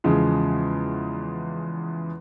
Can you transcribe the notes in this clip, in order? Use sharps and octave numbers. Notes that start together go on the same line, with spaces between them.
E2 C#3 F3 G#3